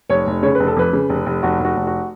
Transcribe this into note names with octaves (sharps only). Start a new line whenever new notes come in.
F1 C#5
F1
C#3 C#5
F1 B4
A4
F2 B4
C#3
F1
F1
F1 F#4
F1
F#4
F1
F#4